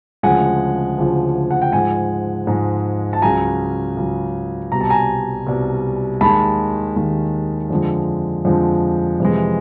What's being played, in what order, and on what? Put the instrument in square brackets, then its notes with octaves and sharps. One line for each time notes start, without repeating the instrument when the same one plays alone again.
[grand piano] D2 C#3 F3 G#3 F#5 G#5
D2 C#3 F3 G#3
F#5
G5
G#2 F3 G#3 F#5 G#5
G#2 F3 G#3
A5
C#2 C#3 F#3 G#5 A#5
C#2 C#3 F#3
C2 B2 G3 A#5
A5
G#5 A#5
C2 B2 G3
D#2 D#3 G#3 A5 B5
D#2 D#3 G#3
F2 D3 F3 G#3
F2 D3 F3 G#3
F2 C3 E3 G#3